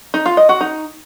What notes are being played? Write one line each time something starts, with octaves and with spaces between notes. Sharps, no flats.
D#4
F4
D#5
F#4
D#4